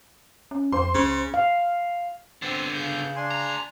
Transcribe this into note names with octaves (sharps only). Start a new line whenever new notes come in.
C#4
F2 C5 C6
C#2 C#3
F5
D3 B3 C4
C#3 G6
D4 G#5 C6
D2 A#5